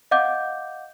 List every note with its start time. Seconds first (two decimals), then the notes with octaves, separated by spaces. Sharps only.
0.11 D#5 F5 F#5 D6 G6